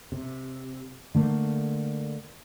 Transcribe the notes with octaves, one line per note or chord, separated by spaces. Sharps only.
C3
D3 A3 A#3